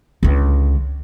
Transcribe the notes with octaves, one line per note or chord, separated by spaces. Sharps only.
C#2 D3